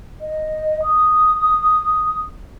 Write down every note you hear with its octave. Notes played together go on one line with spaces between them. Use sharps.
D#5
D#6